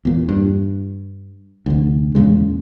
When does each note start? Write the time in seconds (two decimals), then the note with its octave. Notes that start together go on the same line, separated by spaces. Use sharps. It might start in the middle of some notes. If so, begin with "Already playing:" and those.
0.05 E2 A#2
0.29 G2
1.66 F1 D2
2.15 E2 A#2 C#3 G#3